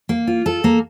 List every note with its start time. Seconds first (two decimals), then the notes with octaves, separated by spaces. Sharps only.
0.09 A#3
0.27 F4
0.46 A4
0.64 A#3